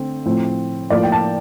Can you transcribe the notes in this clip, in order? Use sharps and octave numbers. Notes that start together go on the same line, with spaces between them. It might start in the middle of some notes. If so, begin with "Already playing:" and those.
Already playing: D3 A3 C4
A2 F3 C4
A2 F3 A#3 D5
G5
A5